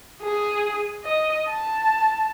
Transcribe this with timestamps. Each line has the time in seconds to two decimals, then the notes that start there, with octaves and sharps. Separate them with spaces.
0.23 G#4
1.05 D#5
1.50 A5